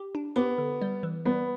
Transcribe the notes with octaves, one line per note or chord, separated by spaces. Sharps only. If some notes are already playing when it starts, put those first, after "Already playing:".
Already playing: G4
D4
B3 G4
D3
G3
E3
G3 B3